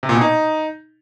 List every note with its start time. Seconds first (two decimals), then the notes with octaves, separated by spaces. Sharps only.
0.03 C3
0.09 A#2
0.15 B2
0.21 D#4